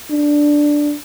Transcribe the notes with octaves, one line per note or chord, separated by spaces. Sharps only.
D4